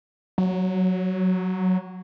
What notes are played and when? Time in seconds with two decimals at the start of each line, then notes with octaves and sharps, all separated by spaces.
0.38 F#3